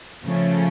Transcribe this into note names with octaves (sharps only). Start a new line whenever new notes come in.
C#3 F3 A3 C#4